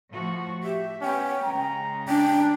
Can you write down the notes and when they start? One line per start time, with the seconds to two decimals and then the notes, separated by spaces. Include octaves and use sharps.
0.11 A2 F3 F#4
0.64 G4 E5
1.01 B3 C#4 G5
1.43 C#3 G#3 A#5
2.08 D4 G5